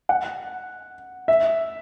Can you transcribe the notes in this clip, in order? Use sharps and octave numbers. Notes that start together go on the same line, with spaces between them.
F#5
E5